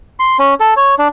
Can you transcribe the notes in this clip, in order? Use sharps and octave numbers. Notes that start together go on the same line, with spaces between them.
C6
C#4
A4
C#5
D4